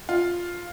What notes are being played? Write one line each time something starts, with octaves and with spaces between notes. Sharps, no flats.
F4